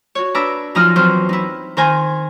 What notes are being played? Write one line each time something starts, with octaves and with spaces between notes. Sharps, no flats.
F#4 C#5
D4 B4 A#5 D6 E6
F#2 F3 D#4 A#5 D#6 F6
E2 F#3 C4 C5 F6
D#4 E4
D#3 A#4 C5 G#5 A#5